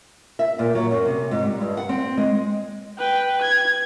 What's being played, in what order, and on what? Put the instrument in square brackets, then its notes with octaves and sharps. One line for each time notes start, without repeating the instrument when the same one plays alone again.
[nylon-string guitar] E5
A#2
F#3
F#2
C3
G#2
G3
G2
F#5
C4
G#3
[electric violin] B4 G5
G#6